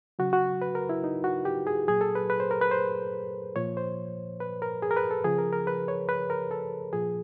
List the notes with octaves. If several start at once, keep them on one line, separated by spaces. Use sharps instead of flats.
C#3 F#3 F#4
F#4
B4
A#4
E4
D#4
F#4
G4
G#4
A#2 F#3 G#4
A4
B4
B4
C5
A#4
B4
C5
A#2 F3 C#5
C5
B4
A#4
G#4
A#4
B4
A4
C#3 F3 G#4
A#4
A#4
B4
C#5
B4
A#4
A4
A#2 F3 G#4